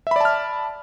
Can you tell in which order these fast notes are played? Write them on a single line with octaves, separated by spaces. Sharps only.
E5 B5 D5 A5 F6